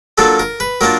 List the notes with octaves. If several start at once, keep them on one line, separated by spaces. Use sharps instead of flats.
F#3 A#3 D4 F4 A4
A#4
B4
F#3 A#3 D4 F4 A#4